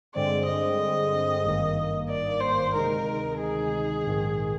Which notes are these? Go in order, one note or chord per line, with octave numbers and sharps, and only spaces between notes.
G2 D3 G#3 C4 D5
D#5
G#1 G2 D#3 A#3
D5
C5
D2 C3 D#3 G#3 D#4 A#4
G#4
A#1 G#2 D#3